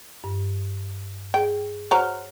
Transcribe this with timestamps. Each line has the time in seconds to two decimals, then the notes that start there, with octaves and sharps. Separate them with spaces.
0.24 G2
1.34 G#4 G5
1.91 F#4 C5 C#5 A#5 F6